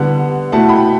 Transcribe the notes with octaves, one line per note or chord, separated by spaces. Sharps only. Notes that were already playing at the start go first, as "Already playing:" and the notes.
Already playing: D3 G3 B3 F#5
B2 A3 E4 F#5 A5
G5 B5